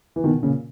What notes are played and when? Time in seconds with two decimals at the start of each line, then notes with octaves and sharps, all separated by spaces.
0.16 E3
0.24 B2 D#3
0.43 A#2 C#3